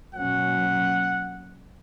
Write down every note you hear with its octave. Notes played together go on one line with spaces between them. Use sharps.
B2 F#3 A#3 C#4 F#5